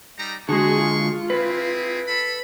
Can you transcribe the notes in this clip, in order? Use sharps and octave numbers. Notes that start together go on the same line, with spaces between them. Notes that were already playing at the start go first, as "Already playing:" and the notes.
G3 D#4 A#5
D3 G#3 F#4 G#4 C6 C#6
F4
C4 E4 G#4 B4
A4 B5